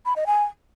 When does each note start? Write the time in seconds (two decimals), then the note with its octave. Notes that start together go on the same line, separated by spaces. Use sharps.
0.06 B5
0.16 D#5
0.27 G#5